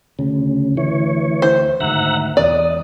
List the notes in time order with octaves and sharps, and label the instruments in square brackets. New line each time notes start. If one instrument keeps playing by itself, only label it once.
[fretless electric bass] D2 [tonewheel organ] C#3
[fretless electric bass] D2 [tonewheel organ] E3 C#5
[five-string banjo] C5
[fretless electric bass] D2 G#2 D#3 [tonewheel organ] E5 F#5 A#5
[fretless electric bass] E1 E2 [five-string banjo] D5 [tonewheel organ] D#5